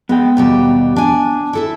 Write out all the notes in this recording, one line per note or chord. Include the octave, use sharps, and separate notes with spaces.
G#3 B3 G5
D#2 B2 G3
D4 G#5
E4 A4 E5